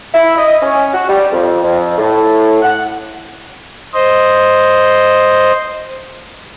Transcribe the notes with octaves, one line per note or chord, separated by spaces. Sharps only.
E4
D#5
C#4
F#4
G3
F2
F2
A2
F#5
C5 D#5